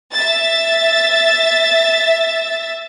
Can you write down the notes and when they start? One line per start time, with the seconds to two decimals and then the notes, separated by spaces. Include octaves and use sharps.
0.13 E5 A6